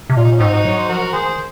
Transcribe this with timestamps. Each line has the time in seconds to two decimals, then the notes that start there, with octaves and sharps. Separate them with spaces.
0.10 C3
0.17 A#2 F4
0.24 D#4
0.31 C#4
0.39 G#2 C4 D#4
0.53 D#4 F#4
0.65 F#3 C#5
0.77 C5
0.89 F3 F#4 A#4
1.13 D#3 G#4 C5